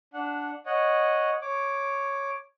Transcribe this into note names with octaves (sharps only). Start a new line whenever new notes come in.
D4 F#5
C#5 D#5 F#5
C#5 D6